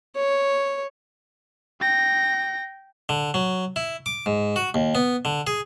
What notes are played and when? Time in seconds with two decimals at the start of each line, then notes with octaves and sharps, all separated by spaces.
0.15 C#5
1.81 G5 A#6
3.09 D3
3.34 F#3
3.76 E4
4.06 D6
4.26 G#2
4.56 F#4
4.74 D#2
4.95 B3
5.25 D3
5.47 G#4